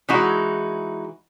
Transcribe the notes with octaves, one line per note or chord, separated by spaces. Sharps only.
E3 G#3 D#4 E4 F#4